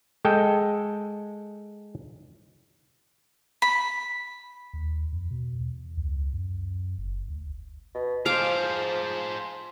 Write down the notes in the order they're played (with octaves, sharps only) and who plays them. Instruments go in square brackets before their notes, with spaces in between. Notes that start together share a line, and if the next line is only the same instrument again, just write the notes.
[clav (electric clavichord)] G#3 A4 G5
[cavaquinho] B5
[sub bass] D#2
F2
B2
E2
C#2
F#2
F#1
D2
[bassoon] B2
[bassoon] F3 [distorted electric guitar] G#4 C5 [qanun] F5 D6